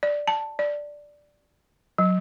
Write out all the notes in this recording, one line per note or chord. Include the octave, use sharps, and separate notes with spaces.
D5
A5
D5
F#3